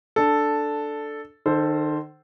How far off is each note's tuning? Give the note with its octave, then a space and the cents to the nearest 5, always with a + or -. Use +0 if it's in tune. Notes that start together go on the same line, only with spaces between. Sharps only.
D4 +5 A4 +0
D#3 -35 A4 +0 C5 +0